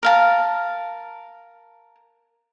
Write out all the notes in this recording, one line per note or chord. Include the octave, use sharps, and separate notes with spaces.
A#4 F5 A5